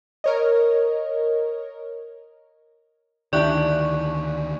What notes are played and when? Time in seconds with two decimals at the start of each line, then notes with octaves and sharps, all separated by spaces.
0.24 A#4 C#5 D#5
3.33 D2 D#3 D4 E4 G4 D5 C#6 F#6